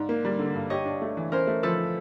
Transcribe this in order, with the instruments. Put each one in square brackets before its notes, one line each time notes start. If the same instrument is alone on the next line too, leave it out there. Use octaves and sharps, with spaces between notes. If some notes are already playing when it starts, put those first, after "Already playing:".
Already playing: [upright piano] G#2 [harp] D5
[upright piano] A#3
G3
D3
G2
[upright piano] G4 [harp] C#5 D#5
[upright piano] D4
A3
E3
[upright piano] C#4 [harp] A#4 C5
[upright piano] A3
[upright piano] F3 [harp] A4 B4